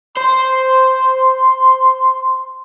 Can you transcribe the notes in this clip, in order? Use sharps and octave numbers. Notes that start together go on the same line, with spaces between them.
C5 C6